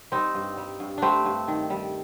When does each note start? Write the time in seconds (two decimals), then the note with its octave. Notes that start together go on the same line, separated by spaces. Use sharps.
0.12 G3 C4 D#4
0.35 G2
0.57 G3
0.80 G2
0.98 G3 A3 C4 D4
1.25 G2
1.48 D#3
1.70 G3